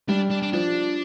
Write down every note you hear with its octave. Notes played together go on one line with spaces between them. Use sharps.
G3 D4
D4
D4
F3 D4